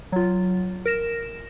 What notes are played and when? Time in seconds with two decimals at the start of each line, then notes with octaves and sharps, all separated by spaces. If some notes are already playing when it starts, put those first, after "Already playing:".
0.12 F#3 F4
0.85 A#4 A#6 E7